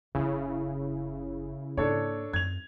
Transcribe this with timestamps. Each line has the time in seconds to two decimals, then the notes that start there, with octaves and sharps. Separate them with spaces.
0.15 F#1 C#3 D4 E4
1.77 G#2 A#3 D4 A4 C#5
2.33 F#2 C4 G#6 F7